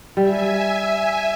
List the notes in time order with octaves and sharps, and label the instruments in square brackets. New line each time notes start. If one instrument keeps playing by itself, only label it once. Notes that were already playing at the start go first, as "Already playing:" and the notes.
[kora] G3 [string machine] E5 G#5